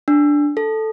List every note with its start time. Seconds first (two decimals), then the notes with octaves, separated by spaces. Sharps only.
0.08 D4
0.57 A4